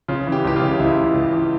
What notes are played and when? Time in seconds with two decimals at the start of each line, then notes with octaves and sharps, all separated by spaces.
0.08 C#3 F4
0.27 E3
0.32 G4
0.44 C#2 G4
0.56 F4
0.62 C#3
0.80 C#2 E4
0.96 C#2
1.14 C#2
1.33 E3